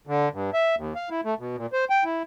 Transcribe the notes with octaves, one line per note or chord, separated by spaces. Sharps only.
D3
G2
E5
D#2
F5
E4
A3
B2
A#2
C5
G5
E4